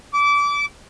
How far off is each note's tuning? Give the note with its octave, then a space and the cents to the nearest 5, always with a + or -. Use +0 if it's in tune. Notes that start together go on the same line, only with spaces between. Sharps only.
D6 -25